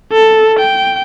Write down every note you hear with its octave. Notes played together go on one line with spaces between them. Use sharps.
A4
G5